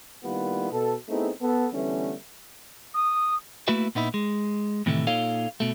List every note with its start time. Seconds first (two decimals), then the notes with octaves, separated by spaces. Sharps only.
0.24 D#3 G3 A#3 B3 E4 F4
0.72 B2 A4
1.08 A3 B3 C4 D#4 E4 G#4
1.41 B3 A4
1.73 D3 E3 G3 A3 B3 C#4
2.94 D#6
3.68 A3 A#3 E4 F#4 B4 E5
3.95 A#2 B3 D#4 E4
4.14 G#3
4.86 A2 C3 D#3 E3 G#3 A3
5.07 A#2 D#4 A4 C#5 F5
5.60 B2 A3